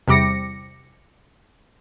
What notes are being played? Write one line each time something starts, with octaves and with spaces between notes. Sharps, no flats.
E2 C3 G3 D6 A#6 C#7